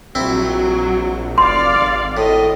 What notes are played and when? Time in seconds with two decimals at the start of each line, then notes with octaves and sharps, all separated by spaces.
0.15 A#1 F#3 C4 E4
1.38 F1 D5 F5 C6
1.75 G#1
2.17 A2 D#5